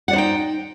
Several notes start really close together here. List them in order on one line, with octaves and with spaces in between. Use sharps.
F#5 D5 C5 D#4 G5